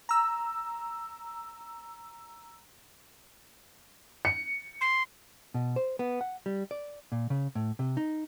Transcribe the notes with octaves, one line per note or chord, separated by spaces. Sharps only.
A#5 E6
C#7
C6
B2
C5
B3
F#5
G3
D5
A#2
C#3
A2
C3
D#4